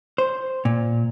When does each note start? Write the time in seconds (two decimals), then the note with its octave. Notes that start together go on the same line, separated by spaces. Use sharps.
0.18 C5
0.65 A#2